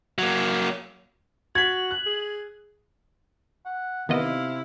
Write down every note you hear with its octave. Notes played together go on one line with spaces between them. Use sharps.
F#3 A#3
F#4 G#6 B6 F#7
F#6
G#4
F#5
C3 D#3 B3 E4 D#5 F5